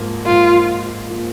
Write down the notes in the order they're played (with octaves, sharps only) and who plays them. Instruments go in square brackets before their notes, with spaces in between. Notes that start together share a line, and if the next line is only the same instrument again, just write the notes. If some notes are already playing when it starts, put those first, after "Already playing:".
Already playing: [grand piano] G#2 F3 A#3
[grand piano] G#2 F3 A#3 [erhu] F4
[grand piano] F3 A#3